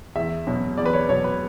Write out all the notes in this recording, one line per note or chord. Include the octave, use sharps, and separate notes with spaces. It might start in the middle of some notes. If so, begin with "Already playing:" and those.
E2 E5
B2 F#3
E2 D5
B4
C#5
B2 F#3 C#5
B4